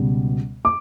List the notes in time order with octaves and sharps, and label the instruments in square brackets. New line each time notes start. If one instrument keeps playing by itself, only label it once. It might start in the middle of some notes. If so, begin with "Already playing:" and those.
Already playing: [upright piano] C#2 B2 G3
D6